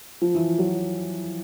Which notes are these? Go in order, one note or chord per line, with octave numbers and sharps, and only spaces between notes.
F3
E3
F#3